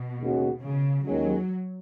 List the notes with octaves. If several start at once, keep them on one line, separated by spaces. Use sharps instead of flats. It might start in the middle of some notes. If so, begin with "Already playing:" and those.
Already playing: B2
D#2 C#3 G#3 C#4 F#4
C#3
D#2 D#3 F#3 G#3 C#4